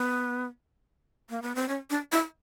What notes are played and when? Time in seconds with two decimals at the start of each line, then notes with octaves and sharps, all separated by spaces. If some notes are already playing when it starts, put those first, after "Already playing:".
Already playing: B3
1.30 A#3
1.42 B3
1.55 C4
1.69 C#4
1.90 D4
2.12 E4